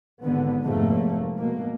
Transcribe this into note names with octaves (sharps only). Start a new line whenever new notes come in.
G#1 D3 B3
F1 G#2 F3 A3 A#3
B2 A#3